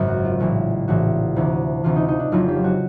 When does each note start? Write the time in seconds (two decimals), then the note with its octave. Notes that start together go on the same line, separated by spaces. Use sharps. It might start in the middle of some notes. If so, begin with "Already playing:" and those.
Already playing: G#1 F#2 C#3
0.08 F#4
0.24 F4
0.39 A#1 A2 E3 F#4
0.88 A#1 A2 E3 F#4
1.36 D2 C3 E3
1.83 D2 C3 E3 F4
1.96 D#4
2.08 D#4
2.20 D4
2.32 F1 F2 C#3 F#3 F4
2.48 G4
2.64 F#4